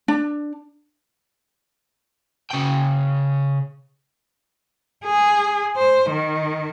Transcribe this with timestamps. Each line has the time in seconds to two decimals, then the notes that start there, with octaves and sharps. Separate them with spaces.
0.08 D4
2.51 C#3 G5
5.05 G#4
5.77 C5
6.11 D#3